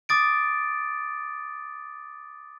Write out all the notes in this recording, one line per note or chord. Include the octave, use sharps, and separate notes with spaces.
D6 D#6 A6 D7